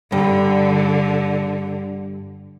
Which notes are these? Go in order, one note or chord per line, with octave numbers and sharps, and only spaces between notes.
G2 D3